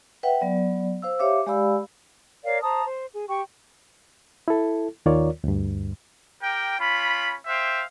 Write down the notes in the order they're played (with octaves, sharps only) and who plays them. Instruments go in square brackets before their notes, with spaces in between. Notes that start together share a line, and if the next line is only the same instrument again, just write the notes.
[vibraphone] B4 E5 F#5 G5
F#3 B3 D5
C5 F5 E6
G4 C#5 E5 F5 D6
G#3 G4 D5 F5 B5 E6
[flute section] A#4 C#5 D5 F5
C5 A5 A#5 D#6
C5
G#4
G4 G5 C#6
[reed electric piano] E4 A4
D#2 D#3 F4 A#4 C#5 D5
D2 G2
[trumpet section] G4 A#4 G5
C#4 F4 B5
C5 E5 F5 G5